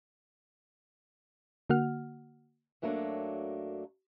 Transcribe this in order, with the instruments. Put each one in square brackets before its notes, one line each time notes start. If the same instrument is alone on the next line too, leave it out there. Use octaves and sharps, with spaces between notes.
[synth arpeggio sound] D3 A#3 F#4 F#5 F6
[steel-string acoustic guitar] F#2 F#3 A3 A#3 C4 D4